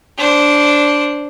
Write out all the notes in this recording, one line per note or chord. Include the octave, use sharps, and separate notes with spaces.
D4 C5